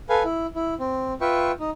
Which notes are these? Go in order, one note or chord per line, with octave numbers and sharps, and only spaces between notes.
A4 B4 F5 G#5
E4
E4
C4
F4 B4 E5 G5 C#6
D#4